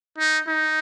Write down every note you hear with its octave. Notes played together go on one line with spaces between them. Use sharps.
D#4
D#4